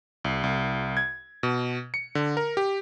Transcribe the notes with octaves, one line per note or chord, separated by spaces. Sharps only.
C2
C2
G#6
B2
C#7
D3
A#4
G4